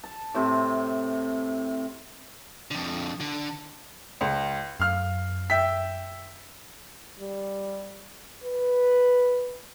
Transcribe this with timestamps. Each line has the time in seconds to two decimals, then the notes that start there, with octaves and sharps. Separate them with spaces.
0.04 A5
0.34 A2 C3 C5
2.71 F2 D3
3.20 D3
4.21 C#2
4.80 F#2 F5 F6
5.50 E5 G5 B6
7.19 G3
8.44 B4